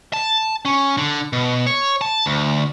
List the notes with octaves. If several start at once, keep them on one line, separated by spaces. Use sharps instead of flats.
A5
C#4
D3
B2
C#5
A5
D2